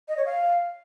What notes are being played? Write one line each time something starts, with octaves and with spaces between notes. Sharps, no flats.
D#5
C#5
F5